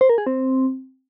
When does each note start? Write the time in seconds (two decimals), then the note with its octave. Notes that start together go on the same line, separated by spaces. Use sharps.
0.01 C5
0.09 A#4
0.18 G#4
0.26 C4